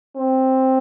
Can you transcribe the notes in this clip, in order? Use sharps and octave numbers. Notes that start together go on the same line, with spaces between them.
C4